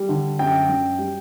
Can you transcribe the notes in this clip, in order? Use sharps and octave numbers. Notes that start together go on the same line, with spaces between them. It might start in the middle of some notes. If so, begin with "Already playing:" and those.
Already playing: G3
D3
F#2 G5
F#2
G3